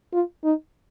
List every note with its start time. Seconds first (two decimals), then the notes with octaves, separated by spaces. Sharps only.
0.13 F4
0.44 D#4